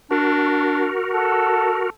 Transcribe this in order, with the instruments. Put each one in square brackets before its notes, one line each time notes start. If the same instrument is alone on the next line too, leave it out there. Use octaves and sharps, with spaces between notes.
[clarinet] D4 [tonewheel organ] F#4 A#4
[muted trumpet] A4 [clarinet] F#5